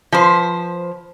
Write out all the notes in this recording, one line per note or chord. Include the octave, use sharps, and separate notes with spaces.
F3 B4 C5